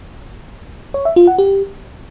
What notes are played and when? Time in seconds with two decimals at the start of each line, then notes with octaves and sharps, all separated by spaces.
0.94 C#5
1.05 E5
1.16 F4
1.27 F#5
1.38 G4